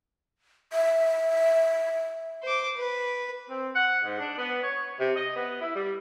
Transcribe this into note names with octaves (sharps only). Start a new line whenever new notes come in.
E5
C5 D6
B4
C4
F#5
G#2
D4
B3
C#5
C3
D#5
B3
E4
G3